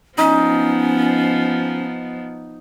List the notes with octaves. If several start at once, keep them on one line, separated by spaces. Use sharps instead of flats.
F3 B3 C#4 D#4